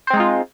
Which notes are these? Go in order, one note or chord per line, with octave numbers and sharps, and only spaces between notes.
G#3 C4 D#4 F4 C5